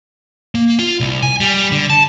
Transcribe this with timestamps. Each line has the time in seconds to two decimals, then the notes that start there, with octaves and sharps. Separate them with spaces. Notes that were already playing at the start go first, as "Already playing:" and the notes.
0.55 A#3
0.79 F4
1.00 C2
1.22 G#5
1.40 G3
1.72 D3
1.90 A5